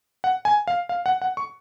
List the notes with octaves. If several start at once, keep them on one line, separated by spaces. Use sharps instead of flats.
F#5
G#5
F5
F5
F#5
F#5
C#6